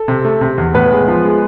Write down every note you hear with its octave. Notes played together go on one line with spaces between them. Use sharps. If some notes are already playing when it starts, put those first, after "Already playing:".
Already playing: A4
C3
A3
C3
E2
A2 B3 B4
G#3
F3
G#3